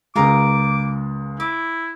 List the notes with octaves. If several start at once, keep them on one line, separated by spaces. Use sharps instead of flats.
C#2 G#3 F4 A#4 A#5 D6
E4 D6